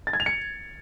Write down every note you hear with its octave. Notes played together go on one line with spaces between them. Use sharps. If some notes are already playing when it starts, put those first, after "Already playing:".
A6
G#6
F7
C#7